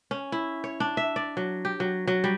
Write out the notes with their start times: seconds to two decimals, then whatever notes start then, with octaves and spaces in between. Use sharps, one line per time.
0.11 C#4
0.32 E4
0.64 C#5
0.80 D4
0.97 E5
1.16 D5
1.37 F#3
1.65 G4
1.80 F#3
2.07 F#3
2.24 G3